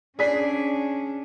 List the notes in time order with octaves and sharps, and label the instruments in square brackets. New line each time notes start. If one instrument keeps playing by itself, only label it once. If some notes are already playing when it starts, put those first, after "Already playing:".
[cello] C#4 D4 [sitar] G#4 [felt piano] D5 B6